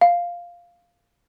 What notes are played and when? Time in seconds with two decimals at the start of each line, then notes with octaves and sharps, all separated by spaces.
0.01 F5